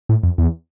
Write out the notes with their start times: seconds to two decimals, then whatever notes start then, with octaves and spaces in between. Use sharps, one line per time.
0.09 A2
0.23 F2
0.38 E2